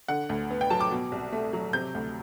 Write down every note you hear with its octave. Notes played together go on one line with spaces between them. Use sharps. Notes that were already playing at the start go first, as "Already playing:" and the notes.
D3 F#5
D2
B3
G5
F#3 A5
D6
B2
C2
A3
F#3
C3 G6
D2